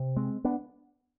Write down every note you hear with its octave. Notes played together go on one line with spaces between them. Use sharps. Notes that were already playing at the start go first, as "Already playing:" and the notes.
Already playing: C3
G#3 C4
B3 D4